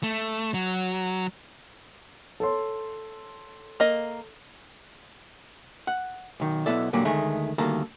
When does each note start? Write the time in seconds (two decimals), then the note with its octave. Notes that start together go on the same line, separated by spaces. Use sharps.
0.03 A3
0.54 F#3
2.40 A4 C#5 C6
3.80 A#3 D#5
5.87 F#5
6.40 B1 D#3
6.66 B1 B3 E4 A4 D5
6.93 A#2 D3 F#3 G3 A#3
7.05 D2 D#3 G#3 A3
7.58 D2 D#3 G3 A#3 A4 A#5